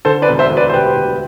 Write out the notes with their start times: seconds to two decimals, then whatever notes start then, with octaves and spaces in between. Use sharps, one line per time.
0.05 D3 A4 C5
0.22 B4 D5
0.28 E1
0.39 C5 E5
0.51 D2
0.57 B4 D5
0.69 C5
0.73 E1 G4 B4
0.96 D2